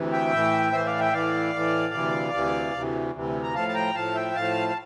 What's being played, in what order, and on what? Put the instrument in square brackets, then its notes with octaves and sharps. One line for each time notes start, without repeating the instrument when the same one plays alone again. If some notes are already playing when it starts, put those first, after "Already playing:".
Already playing: [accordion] D2 C3 E3
E5 G5
A2 E3
A2 E3 C5 E5
D5 F5
E5 G5
A2 E3 D5 F5
A2 E3
D2 C3 E3
D2 C3 E3
D2 C3 E3
D2 C3 E3
A#5
A2 F3 F5 A5
A5
G5 A#5
A2 F3 F5 A5
E5 G5
A2 F3 F5 A5
F5